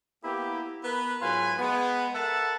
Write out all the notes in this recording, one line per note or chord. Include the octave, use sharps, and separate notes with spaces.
A#3 B3 E4 G4
B3 A#4 B4
G#2 F#3 F4 B4 G#5
G#3 B3
A4 A#4 E5 F#5 A5